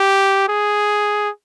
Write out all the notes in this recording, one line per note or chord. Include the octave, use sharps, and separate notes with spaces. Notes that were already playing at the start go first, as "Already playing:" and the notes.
Already playing: G4
G#4